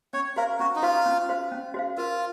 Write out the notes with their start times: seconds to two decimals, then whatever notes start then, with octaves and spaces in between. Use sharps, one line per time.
0.13 C#4 C#5
0.36 F#4 A#4 C5 F5
0.60 C#4 F#4
0.76 D#4
0.83 F4 F#4 C5 F5
1.06 C#4
1.29 F#4 C5 F5
1.52 C#4
1.74 F#4 C5 F5
1.98 F4 A#4